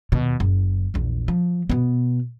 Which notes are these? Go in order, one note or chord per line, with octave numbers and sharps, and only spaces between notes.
D#2 B2
F#1
A#1 E2
F3
B2 B3